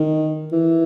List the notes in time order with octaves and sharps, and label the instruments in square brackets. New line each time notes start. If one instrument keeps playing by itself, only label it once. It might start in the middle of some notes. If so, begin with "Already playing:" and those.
Already playing: [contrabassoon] D#3
E3